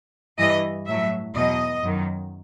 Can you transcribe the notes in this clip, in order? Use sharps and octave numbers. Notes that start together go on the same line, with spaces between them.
G2 E3 D#5
A2 F#3 E5
E2 B2 F#3 D#5
F#2 D#3 F#3